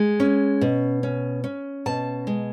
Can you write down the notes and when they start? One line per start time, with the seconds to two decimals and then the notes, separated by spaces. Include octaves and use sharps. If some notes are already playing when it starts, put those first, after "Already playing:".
Already playing: G#3
0.20 C#4
0.61 B2
1.03 C#4
1.44 C#4
1.86 B2 A5
2.27 G#3